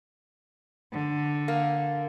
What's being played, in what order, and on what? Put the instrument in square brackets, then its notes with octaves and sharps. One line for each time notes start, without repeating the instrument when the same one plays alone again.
[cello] D3
[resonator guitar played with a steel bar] A#3